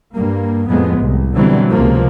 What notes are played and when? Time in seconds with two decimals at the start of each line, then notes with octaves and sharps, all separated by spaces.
0.14 G2 A#3
0.68 F2 A2 F3 G#3 B3
0.98 C2
1.35 B2 D3 E3 F#3 G3 C4
1.70 C#2 C3 F3 A#3